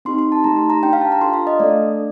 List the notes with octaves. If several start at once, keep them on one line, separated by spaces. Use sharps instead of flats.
C4 D#4 G4 C6
C6
A5
A3 D#4 G4 A#5
C6
A#5
D4 G4 G5
F5
A5
A#5
D4 F4 A4 C6
F5
D#5
A3 D4 A4 D5